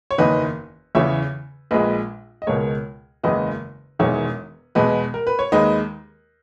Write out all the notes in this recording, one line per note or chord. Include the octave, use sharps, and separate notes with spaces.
C#5
F#1 E2 D#3 B4 D#5
E2 C#3 E3 C#5 E5
A#1 A#2 G#3 B4 D#5
D#5
C#2 B2 G#3 A#4 C#5
F#1 E2 C#3 G#3 B4 D#5
E1 E2 D#3 G#3 C#5 E5
E2 B2 G#3 B4 D#5
A#4
B4
C#5
D#2 D#3 G#3 B4 D#5